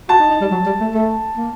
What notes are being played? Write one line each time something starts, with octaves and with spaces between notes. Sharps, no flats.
F#4 A5
D#4
D#4
G3
F#3
G3
A3
A3
A#3